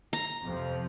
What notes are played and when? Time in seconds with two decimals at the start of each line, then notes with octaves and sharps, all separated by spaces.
0.13 A#5
0.44 F2 C3 F3